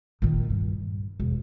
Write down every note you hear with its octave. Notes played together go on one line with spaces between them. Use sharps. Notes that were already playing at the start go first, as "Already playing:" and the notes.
A#2 D#3
G2
E1